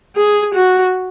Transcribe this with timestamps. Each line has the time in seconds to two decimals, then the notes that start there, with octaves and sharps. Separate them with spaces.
0.17 G#4
0.55 F#4